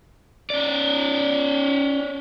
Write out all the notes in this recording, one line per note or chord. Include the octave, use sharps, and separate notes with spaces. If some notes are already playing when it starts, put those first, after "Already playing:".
C#4 D5